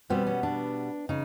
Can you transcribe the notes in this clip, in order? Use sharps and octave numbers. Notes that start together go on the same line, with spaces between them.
B2 G3 B3 C4
C#4
D4
C#3 D#4